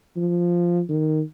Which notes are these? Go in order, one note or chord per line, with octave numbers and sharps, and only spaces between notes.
F3
D#3